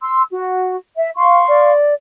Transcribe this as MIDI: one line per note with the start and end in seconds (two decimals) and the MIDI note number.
0.02 0.22 84
0.02 0.22 88
0.30 0.76 66
0.97 1.10 76
1.17 1.71 77
1.17 1.71 84
1.17 1.71 85
1.49 1.94 74